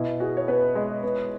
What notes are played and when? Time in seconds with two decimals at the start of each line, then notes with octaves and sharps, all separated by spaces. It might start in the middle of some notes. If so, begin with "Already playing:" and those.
Already playing: B2 E4
0.20 F#4 G#4
0.37 C#5
0.48 B3 B4
0.75 G#3
1.03 B3